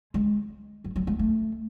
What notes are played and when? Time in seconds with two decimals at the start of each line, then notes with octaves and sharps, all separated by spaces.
0.14 G#3
0.84 F#3
0.96 F#3
1.07 G#3
1.19 A3